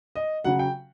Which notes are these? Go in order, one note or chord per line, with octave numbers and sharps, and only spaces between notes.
D#5
C#3 F#3 F#5
G5